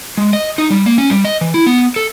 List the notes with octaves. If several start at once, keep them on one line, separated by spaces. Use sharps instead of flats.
G#3
D#5
D#4
G3
A#3
C#4
G3
D#5
E3
E4
B3
A4